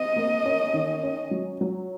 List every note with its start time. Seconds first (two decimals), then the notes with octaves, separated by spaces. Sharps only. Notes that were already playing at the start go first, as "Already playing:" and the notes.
Already playing: C4 D#5
0.16 A#3
0.45 C#4
0.74 D#3
1.03 C#4
1.31 F#3
1.61 F#3